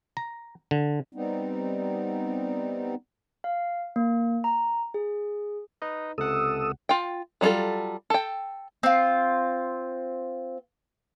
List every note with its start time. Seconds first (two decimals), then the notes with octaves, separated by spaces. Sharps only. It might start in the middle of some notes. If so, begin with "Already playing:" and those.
0.17 A#5
0.71 D3
1.13 G3 B3 C4 D#4
3.44 F5
3.96 A#3
4.44 A#5
4.94 G#4
5.82 D#4 B4 D#5
6.18 C#2 C3 A4 F#5 D#6 E6
6.89 F4 G5
7.41 F#3 G3 B3 F4 A4
8.10 A4 G5
8.83 C4 F4